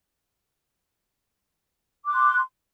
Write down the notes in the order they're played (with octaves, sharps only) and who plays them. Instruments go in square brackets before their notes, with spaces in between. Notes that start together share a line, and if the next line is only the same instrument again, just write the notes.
[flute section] D6
F#6
C6